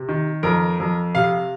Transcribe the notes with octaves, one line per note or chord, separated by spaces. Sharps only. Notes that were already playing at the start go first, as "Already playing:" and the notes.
Already playing: C3
D#3
F2 A#4
F2
C3 F5